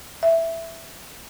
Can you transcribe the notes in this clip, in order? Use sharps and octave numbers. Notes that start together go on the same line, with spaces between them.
E5